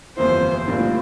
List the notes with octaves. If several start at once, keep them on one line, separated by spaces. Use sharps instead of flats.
G1 F2 E3 A#3 E4 C5
A#1 A2 G3 A#3 F4